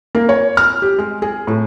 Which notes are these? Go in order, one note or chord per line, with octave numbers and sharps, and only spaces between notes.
A#3
C#5
F6
G4
G#3
G#4
A2